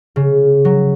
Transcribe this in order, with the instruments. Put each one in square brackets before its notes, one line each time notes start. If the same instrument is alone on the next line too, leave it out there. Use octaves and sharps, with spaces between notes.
[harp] C#3
F#3